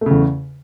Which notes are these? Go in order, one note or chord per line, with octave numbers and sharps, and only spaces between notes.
E2 C#3 A3